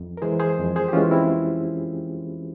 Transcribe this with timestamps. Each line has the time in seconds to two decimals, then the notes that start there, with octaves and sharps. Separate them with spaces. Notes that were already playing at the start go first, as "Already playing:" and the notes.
Already playing: F2
0.17 A#4
0.22 E3 G#3 G#4 C5
0.40 G#4 C5
0.58 F2
0.76 G#4 C5
0.88 G4
0.93 E3 G#3 C#4 F4
1.11 C4 E4